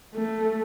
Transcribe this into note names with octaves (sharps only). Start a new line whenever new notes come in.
A3